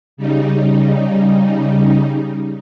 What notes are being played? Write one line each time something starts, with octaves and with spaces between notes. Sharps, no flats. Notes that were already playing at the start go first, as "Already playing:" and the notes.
C#3 G3 D#4